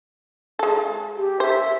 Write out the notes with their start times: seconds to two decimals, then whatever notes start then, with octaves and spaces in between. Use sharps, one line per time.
0.59 G#3 A4
1.17 G4
1.40 C5 E5